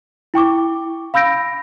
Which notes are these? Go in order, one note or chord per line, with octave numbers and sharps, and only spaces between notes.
E4 G5 C#6 D6
F5 B5 E6 G6 A#6 D7